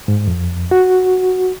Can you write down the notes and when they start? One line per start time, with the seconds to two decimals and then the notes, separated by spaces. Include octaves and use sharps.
0.08 G#2
0.27 F2
0.71 F#4